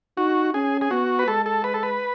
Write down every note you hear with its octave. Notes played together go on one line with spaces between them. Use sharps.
D#4 F#4
C#4 G#4
G#4
B3 F#4
B4
G#3 A4
A4
B4
A4
B4